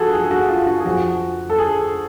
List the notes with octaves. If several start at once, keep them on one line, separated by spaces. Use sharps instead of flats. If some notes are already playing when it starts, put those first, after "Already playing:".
Already playing: F3 F#4 G#4 A4
G#4
G#4
F#4
F4
F#4
G#4
F2 F3 F#4
A4
G#4